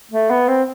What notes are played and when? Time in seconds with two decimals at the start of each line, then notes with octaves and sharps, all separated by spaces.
0.12 A3
0.30 B3
0.48 C4